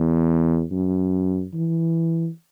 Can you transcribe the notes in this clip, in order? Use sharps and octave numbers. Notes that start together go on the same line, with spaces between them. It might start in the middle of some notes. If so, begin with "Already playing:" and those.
Already playing: E2
F#2
E3